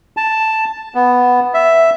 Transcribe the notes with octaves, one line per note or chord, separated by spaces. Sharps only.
A5
B3
E5